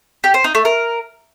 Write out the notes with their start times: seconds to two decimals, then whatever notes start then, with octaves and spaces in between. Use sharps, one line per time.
0.24 G4
0.34 C5
0.44 D#4
0.55 A3
0.65 A#4